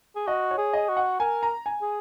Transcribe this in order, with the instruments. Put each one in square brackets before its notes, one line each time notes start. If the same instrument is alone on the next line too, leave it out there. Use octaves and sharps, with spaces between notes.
[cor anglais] G#4
[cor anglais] F#4 [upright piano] D#5
[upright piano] C#5
[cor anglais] G#4
[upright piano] D#5
[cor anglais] F#4
[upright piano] F#5
[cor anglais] A#4 [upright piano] G#5
[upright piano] A#5
G#5
[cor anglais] G#4